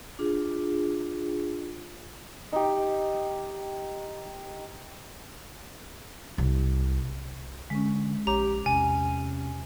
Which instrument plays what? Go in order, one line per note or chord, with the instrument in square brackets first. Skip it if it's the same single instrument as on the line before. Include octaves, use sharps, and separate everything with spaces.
[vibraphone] D4 F4 G#4
[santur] D#4 G4
[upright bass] C2
[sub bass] D3 [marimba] G#3 C#4
[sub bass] A#1 [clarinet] G4 [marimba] C#5 [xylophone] A#5
[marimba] E2 [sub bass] C3 [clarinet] C#4 [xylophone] G#5